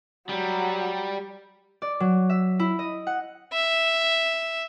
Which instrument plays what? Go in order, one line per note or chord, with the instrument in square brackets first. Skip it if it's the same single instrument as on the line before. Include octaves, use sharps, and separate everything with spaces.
[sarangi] F#3 [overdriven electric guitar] G3
[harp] D5
F#3
E5
E4
D#5
F#5
[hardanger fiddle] E5